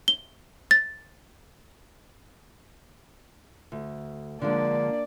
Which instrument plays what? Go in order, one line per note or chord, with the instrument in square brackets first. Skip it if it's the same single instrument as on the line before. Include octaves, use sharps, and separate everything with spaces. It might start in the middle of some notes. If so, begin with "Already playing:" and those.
[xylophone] G7
A6
[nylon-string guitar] D2
[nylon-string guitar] D3 F3 G#3 [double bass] A#3 D4 [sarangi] D5